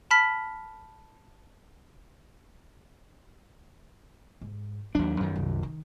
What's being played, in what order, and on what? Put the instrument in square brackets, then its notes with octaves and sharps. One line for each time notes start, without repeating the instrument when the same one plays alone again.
[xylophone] A5 B5 F6 B6
[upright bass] G#2
[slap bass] D#2 D4 [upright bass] F#3
[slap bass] F#2 D#3
[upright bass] C2
D#3